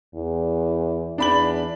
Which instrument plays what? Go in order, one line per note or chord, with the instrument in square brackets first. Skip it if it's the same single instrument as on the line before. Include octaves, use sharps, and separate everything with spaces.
[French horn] E2
[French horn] E2 [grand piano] D4 B5 F#7